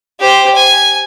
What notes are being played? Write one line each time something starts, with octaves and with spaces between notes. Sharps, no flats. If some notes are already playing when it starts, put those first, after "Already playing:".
G4 C5
G#5